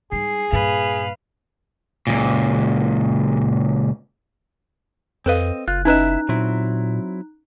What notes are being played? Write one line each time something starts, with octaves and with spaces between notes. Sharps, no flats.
G#2 G3 G#4 C7
G2 A#2 B4 F5
C#2 A#2
F2 C4 A4 B4 D#5 F5
F#1 F4 F#6
C#4 D#4 E4 B4 D#5 E5 A#5 F#6
A#2 F#3 C4 E4